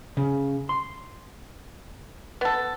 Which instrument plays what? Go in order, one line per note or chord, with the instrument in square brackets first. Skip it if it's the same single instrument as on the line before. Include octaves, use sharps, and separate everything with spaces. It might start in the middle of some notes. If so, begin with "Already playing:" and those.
[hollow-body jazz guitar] C#3
C6
[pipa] B3 A4